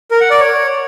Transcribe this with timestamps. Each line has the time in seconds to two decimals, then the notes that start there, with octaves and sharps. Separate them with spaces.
0.11 A#4
0.21 F#5
0.31 D5
0.40 C#5